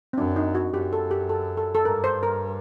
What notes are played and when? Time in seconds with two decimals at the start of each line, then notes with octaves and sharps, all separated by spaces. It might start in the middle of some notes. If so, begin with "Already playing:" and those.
0.13 C4
0.17 F#2 D4
0.36 D#4
0.55 F#4
0.73 F#2 G4
0.93 A4
1.11 G4
1.29 A4
1.57 A4
1.75 A4
1.85 G2 A#4
2.04 C5
2.23 A#4